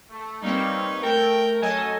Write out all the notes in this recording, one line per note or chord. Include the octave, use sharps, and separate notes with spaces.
A3
G3 A#3 C4 D#4 B4 C#5 F5
A3 A#4 G5
F#3 C#4 A4 D#5 G#5